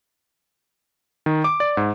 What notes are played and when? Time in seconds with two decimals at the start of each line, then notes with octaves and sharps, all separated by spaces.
1.26 D#3
1.44 D6
1.60 D5
1.77 G#2